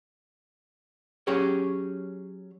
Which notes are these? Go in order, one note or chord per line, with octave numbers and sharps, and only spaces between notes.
F#3 C#4 G4 G#4 C#5